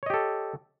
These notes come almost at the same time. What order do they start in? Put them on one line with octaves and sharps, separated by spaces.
C#5 D#5 G4 A4